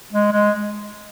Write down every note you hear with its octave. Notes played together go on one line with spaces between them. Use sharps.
G#3
G#3